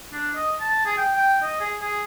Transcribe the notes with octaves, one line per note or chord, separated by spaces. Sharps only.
D4
D#5
A5
G#4
G5
G5
D#5
G#4
G#4